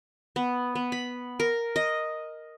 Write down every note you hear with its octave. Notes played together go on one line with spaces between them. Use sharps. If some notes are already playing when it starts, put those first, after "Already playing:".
B3
B3
B5
A#4
D#5